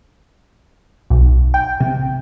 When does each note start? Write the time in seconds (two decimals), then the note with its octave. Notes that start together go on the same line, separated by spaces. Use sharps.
1.10 B1
1.54 G5
1.80 C3